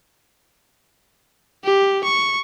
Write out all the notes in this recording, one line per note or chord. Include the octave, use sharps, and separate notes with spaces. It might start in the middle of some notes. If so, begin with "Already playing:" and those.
G4
C#6